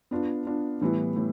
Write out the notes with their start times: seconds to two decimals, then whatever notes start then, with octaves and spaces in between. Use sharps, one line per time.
0.11 B3 D4 F4
0.46 B3 D4 F4
0.81 A2 E3 G3 B3 E4
1.16 A2 E3